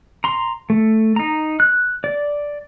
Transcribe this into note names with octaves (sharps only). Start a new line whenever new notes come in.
A#5 C6
A3
D#4 A#5
F#6
D5